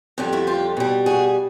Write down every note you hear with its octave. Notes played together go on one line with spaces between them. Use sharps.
F2 D3 G3
E4 F#4
F4 G4
B2 G3
F#4 G#4